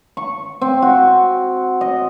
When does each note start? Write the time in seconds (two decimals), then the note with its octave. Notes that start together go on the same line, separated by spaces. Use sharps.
0.17 C#6
0.61 C4
0.82 F#4
1.81 D#5